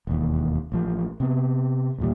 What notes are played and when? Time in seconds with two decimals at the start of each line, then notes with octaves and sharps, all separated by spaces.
0.07 E1 D#2
0.72 A1 F3
1.20 C3 B3
1.98 A1 D#2 A#2 G3